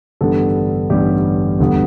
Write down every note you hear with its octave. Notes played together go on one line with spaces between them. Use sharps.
A1 G2 D3 G3 B3 A4
A1 G2 D3 G3 B3 G4
E1 D2 D3 G3 B3